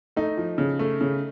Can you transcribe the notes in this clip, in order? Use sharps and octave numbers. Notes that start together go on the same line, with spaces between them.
A3 D#4
F3
C#3
A3
C#3